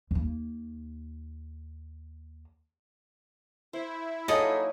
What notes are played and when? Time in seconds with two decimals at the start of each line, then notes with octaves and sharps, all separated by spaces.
0.11 D#2 A#3
3.73 E4 C5
4.28 F#3 A#3 D#4 G#4 A4 D#5 D#6